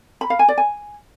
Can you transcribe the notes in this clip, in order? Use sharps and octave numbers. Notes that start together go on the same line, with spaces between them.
B5
F5
G#5
D5
G#5